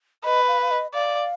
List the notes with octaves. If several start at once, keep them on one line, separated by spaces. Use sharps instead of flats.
B4 D#5
F5
F5
D#5
D5 F5